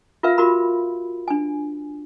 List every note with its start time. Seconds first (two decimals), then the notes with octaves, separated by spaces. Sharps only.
0.23 F4 A#4 B4 E5 F5
0.38 F4 F#4 A#4 B5
1.28 D4 G#5